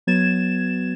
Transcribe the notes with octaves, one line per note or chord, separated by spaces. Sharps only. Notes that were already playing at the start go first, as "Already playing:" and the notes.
F#3 B3 G#6 A6 E7